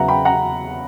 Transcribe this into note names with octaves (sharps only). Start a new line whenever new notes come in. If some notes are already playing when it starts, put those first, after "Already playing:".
Already playing: E2 C#3 F#3 B3 E5 F#5 A#5
G5 B5
F#5 A#5